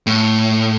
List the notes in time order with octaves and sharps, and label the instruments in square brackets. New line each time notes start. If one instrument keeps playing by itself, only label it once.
[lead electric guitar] A2